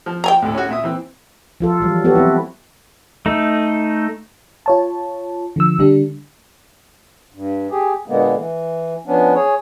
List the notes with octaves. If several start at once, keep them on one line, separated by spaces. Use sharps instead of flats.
F3
G5 G#5 A#5
D2 A2
C#4 F#4
A#2 E5 D#6
E3 C4
F3 F4 A4
E3 F#3 G3
B3 F#4 G4 A4
F#3 C4 E4
A3 D#4
F4 C#5 A5
D3 F3 E6
D3 G3 D4
G2
G4 G#4
A#2 D3 G#3 A#3 B3
E3
F3 B3 C#4 D4
G#4 C#5